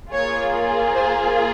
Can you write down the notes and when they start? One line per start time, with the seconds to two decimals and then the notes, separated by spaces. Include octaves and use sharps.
0.12 A#3 F4 G#4 C#5
0.95 C5